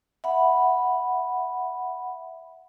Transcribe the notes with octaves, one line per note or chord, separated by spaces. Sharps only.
E5 F#5 B5